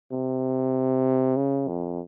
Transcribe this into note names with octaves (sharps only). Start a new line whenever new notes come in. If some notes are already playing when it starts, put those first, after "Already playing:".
C3
C#3
F2